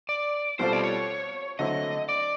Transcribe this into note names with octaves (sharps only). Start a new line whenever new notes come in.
D5
B2 G3 C4 F4 A4 C5
D5
C#5
D3 F#3 A3 C4 E4 D#5
D5